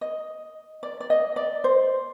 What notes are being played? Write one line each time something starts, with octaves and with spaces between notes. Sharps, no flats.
D#5
D5
D5
D#5
D5
C5